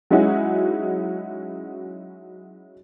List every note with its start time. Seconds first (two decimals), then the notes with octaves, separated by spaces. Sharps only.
0.11 F#3 G#3 C#4 D#4 E4 F#4